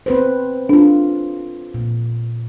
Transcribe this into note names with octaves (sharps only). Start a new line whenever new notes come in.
C4 B4 C5
D4 F4 A4
A#2